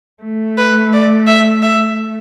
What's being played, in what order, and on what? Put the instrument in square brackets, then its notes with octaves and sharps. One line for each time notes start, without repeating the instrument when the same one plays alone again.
[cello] A3
[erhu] B4
D5
E5
E5